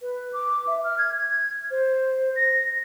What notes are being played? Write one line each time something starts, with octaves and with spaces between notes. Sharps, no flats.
B4
D6
E5
F6
G#6
G#6
C5
A#6